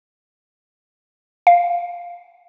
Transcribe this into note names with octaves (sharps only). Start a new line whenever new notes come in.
F5